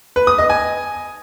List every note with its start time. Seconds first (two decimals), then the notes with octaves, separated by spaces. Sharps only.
0.16 B4
0.27 D#6
0.38 D#5
0.50 G#5